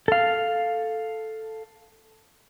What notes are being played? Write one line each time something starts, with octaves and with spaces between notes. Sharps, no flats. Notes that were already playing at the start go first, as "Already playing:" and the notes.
A4 F5